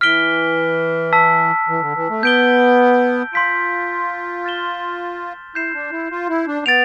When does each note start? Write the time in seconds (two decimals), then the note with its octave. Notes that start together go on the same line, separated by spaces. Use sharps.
0.01 E3 F6 B6 D7 G7
1.13 A5 E6 B6
1.68 E3
1.81 D3
1.95 E3
2.10 A3
2.23 B3 G6 D7 G7
3.33 F4 C6 G6 B6 D7
4.44 F6 A6 E7 G7
5.55 E4 G6 C7 E7
5.74 D4
5.92 E4
6.11 F4
6.29 E4
6.47 D4
6.66 B3 A6 D7 F7